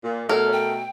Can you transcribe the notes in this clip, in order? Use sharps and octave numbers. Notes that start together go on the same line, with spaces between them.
A#2
B2 A3 A#4 C#5
G5